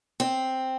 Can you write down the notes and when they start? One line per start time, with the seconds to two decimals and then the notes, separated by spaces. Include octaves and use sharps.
0.20 C4